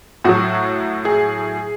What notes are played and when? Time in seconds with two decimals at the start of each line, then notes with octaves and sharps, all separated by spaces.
0.24 A2 F#3 F#4
1.05 G#4